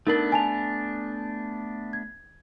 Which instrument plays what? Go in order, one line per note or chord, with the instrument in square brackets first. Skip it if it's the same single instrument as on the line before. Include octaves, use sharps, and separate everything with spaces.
[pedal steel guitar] A3 B3 D4 [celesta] D#4 A#4 F#7
[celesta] G#5 A5 F7
G#6